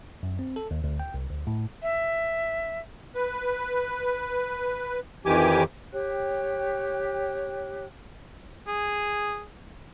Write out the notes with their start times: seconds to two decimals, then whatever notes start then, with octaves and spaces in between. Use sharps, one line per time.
0.23 F#2
0.39 C4
0.56 A4
0.71 D#2
0.84 D2
1.00 G5
1.14 C2
1.31 D2
1.47 A2
1.82 E5
3.14 B4
5.26 F2 D#3 E3 G4 G#5 D6
5.93 G4 C#5 G5 F#6
8.68 G#4